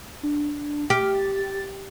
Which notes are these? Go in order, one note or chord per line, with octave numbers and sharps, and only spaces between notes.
D4
G4 F6
A6